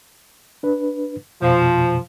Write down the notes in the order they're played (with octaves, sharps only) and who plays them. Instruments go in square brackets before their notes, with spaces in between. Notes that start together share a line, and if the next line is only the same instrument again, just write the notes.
[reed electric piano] D4 B4
[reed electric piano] F2 B2 [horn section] F3